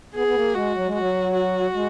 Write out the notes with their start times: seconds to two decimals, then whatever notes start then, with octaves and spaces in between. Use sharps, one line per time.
0.15 B3 G#4
0.27 B3
0.35 A#3
0.54 G#3 F#4
0.75 F#3
0.86 G#3
0.94 F#3 F#4
1.34 F#4
1.74 G#3